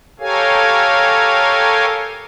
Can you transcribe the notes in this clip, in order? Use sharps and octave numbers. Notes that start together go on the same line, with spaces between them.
G4 A4 A#4 C#5 F5 G#5